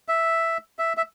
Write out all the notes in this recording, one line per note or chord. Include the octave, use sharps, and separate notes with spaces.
E5
E5
E5